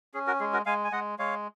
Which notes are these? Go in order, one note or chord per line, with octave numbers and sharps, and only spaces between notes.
C#4 G#4
F#4 A#4
G#3 G#4
F#4 A#4
G#3 F5 G#5
G#5
G#3 D#5 F#5
G#3 C#5 F5